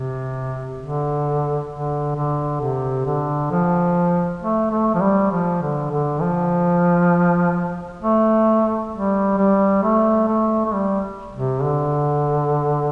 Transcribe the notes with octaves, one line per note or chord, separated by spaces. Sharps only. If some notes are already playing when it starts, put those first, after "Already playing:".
Already playing: C3
D3
D3
D3
C3
D3
F3
A3
A3
F3
G3
F3
D3
D3
F3
A3
G3
G3
A3
A3
A3
G3
C3
D3